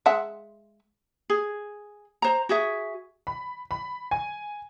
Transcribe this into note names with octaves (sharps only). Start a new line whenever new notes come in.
G#3 E5 F#5
G#4
C5 A#5
F#4 G#4 E5
B5
B5
G#5